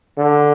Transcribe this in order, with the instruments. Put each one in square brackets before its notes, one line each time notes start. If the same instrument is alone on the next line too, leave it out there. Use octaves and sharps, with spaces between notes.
[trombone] D3